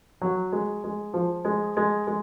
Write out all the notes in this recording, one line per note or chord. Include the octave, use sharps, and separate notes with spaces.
F#3
G#3
G#3
F3
G#3
G#3
G#3